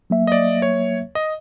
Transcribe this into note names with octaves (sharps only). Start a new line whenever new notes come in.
F#3 A#3 E5
D5 D#5
C#5
D#5